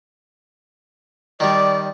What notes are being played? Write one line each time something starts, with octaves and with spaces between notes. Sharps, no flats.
D#3 G3 D5